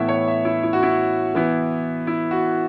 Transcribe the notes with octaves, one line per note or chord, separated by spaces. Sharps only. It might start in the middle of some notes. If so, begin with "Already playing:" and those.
Already playing: A2 E3 B3 E4 E5
C#5
E5
E4
E4
F#4
E4
E3 B3 E4
E4
F#4